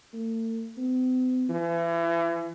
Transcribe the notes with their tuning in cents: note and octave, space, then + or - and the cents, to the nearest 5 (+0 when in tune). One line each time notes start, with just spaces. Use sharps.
A3 +45
C4 -45
E3 +35